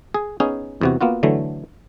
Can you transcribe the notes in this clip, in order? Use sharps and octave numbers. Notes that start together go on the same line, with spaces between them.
G#4
B3 C#4 D#4 G#4
E2 C3 F#4
A#3 B3 F4 F#4
D3 E3 F#3 A3